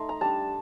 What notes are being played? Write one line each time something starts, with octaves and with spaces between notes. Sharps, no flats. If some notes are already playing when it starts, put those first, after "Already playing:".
Already playing: A3 D#4 D#5 C6
A#5
G3 D4 A5